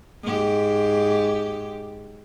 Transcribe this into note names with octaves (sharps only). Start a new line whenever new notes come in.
G#2 G4